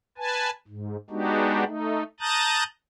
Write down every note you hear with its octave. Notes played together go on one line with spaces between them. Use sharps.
B4 G#5 A5
G#2
G#3 B3 D4 D#4 F#4 G4
A3 D#4
A5 A#5 D#6 F#6 G6 A6